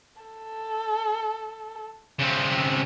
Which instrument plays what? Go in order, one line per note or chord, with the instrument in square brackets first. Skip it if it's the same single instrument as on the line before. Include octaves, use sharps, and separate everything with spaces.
[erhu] A4
[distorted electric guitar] C#3 C4